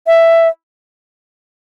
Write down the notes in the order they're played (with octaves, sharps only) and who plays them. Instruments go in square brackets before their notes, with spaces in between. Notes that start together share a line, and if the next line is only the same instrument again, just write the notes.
[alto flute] E5